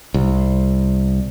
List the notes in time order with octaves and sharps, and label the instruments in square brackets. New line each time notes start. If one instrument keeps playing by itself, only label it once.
[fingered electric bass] C2